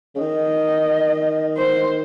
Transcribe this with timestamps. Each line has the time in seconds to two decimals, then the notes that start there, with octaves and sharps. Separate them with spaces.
0.15 C#3
0.20 D#3 D#5
1.57 C5